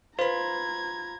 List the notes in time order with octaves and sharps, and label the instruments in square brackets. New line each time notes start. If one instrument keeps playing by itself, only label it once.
[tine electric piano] F4 B5 [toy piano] B4 C5 [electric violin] A#5 G#6